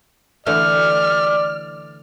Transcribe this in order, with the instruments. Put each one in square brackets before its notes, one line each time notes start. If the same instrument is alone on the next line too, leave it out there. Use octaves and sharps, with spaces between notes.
[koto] D3 E3 A3 [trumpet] D5 [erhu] F6